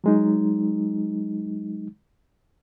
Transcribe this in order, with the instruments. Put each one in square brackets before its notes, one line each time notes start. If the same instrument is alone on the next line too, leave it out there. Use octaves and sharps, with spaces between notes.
[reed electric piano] F#3 G#3 D#4